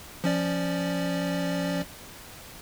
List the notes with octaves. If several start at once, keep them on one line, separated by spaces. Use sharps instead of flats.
F3 C#4 D5